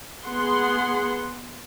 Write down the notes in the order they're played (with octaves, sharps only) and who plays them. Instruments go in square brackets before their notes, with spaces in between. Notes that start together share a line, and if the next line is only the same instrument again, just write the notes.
[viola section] B3 G#4 F#5 C6